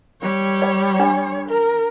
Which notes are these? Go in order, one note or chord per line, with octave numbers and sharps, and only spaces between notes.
G3 C#5
D5
D4
A#4